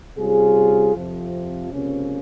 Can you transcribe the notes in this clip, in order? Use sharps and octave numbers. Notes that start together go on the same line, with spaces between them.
C3 G3 C#4 F4 G#4
F2 C3 F3
C#2 C3 F3 A#3 C#4